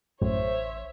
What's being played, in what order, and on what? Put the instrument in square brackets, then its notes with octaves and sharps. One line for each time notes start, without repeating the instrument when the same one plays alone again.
[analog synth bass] A1 [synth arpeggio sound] F#2 A2 [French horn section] C5 [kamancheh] C#5 E5